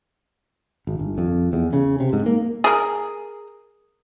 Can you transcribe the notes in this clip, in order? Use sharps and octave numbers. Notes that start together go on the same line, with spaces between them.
G#1
G1
F2
E2
C#3
C3
G#2
A#3
G#4 A#4